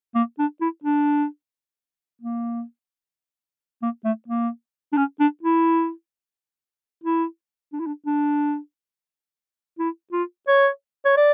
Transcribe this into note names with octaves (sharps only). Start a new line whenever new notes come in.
A#3
D4
E4
D4
A#3
A#3
A3
A#3
D4
C#4
D4
E4
E4
D4
E4
D4
D4
E4
F4
C#5
C#5
D5